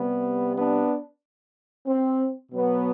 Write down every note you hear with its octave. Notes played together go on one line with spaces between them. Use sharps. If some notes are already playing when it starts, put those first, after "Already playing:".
Already playing: C3 G3 B3
B3 D4
C4
B2 F#3 B3